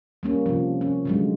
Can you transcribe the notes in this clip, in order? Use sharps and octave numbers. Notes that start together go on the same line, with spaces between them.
G3 A#3 C#4
C3 F3
C#4
D3 F#3 G#3